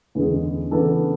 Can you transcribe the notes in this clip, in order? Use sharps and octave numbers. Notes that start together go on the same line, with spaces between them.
E2 D3 G#3 C#4 G#4
C#3 E3 B3 D4 A4